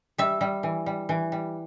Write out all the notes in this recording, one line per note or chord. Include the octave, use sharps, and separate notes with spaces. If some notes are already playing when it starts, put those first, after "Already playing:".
G3 E5
G3
E3
G3
E3
G3